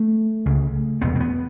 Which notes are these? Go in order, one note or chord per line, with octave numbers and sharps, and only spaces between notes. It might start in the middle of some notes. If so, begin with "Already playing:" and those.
Already playing: A3
C#2 C#3
F1 E2 B2 B3
C4
B3